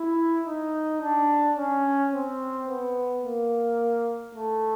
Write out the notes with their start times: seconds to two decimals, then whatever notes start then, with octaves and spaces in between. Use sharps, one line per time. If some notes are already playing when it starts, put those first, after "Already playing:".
Already playing: E4
0.47 D#4
1.01 D4
1.57 C#4
2.13 C4
2.68 B3
3.24 A#3
4.35 A3